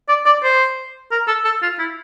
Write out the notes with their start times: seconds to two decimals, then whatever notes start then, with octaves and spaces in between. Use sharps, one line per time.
0.09 D5
0.26 D5
0.43 C5
1.12 A#4
1.28 A4
1.45 A4
1.62 F4
1.79 E4